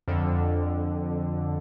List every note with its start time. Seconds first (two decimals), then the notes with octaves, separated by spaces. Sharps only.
0.08 F2 D3